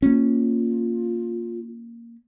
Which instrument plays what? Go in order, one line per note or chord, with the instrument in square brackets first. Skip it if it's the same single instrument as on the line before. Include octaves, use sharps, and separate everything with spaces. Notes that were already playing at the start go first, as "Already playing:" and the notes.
[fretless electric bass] A#3 C#4 [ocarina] F4